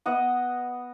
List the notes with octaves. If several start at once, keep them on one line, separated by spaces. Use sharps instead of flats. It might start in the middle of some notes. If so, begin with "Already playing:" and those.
B3 D#5 F#5